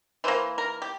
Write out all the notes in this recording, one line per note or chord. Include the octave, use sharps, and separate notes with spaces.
E3 A#3 C5
A#4
G4